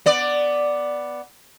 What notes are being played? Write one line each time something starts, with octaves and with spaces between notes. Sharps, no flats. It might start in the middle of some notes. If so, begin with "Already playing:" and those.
B3 D5